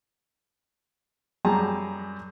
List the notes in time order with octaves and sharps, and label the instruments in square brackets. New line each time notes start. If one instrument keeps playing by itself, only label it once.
[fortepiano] F#2 G3 G#4 A5 A#5